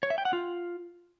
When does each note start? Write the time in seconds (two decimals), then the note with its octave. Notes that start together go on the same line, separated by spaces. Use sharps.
0.03 C#5
0.10 E5
0.18 G5
0.25 F#5
0.33 F4